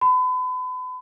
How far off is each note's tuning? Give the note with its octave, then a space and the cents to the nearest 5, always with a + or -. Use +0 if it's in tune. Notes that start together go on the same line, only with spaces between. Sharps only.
B5 +35